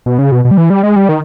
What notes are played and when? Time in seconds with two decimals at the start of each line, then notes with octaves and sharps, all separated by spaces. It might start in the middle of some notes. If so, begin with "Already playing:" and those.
0.06 B2
0.19 C#3
0.32 B2
0.45 B2
0.51 G3
0.58 E3
0.70 G3
0.83 G#3
0.96 G3
1.09 D#3